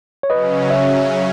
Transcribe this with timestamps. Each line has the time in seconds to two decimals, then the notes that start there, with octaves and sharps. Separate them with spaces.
0.23 C#5
0.30 C#3 F#3 C#4 B4 D#5
0.70 C#5 E5